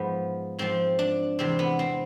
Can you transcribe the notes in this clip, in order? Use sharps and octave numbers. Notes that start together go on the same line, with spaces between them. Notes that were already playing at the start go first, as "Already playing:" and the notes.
Already playing: G#2 F3 B3
G#2 F3 C4
D4
E2 C3 E3 C4
B3
C4